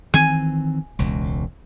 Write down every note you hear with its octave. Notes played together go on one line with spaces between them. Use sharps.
D#3 E3 C4 G#5
E1 C#2